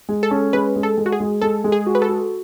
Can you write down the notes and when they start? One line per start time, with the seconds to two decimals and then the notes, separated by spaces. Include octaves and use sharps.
0.09 G#3
0.23 A4
0.31 C#4
0.53 G#3 B4
0.76 G#3
0.83 A4
0.97 G#3
1.06 F#4
1.12 G#4
1.20 G#3
1.42 G#3 A4
1.64 G#3
1.72 G#4
1.86 F#4
1.95 B4
2.02 A4
2.09 F#4